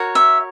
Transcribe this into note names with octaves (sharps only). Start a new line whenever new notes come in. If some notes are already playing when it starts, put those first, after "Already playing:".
Already playing: F#4 A#4 C#5
E5